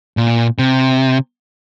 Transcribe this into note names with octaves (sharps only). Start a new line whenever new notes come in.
A#2
C3